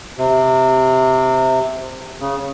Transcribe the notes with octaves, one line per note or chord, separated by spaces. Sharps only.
C3
C#3